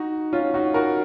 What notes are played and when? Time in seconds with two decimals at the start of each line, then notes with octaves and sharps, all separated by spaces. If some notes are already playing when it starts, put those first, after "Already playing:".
Already playing: D#4 F#4
0.33 C#4 F4
0.54 D#4 F#4
0.74 F#4 A#4